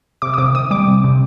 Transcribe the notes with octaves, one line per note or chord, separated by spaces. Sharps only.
C3 D6
D#6
C3 D6
D#3 D#6
G3 D6
C3
C3